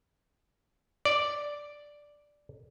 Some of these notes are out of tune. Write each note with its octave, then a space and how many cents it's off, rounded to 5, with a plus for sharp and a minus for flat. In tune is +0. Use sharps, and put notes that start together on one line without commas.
D5 +0